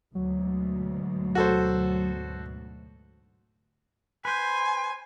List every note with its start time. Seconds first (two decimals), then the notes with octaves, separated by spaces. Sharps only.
0.15 D2 G#2 B2 F#3
1.35 F#4 A4 C5
4.25 B4 C5 G#5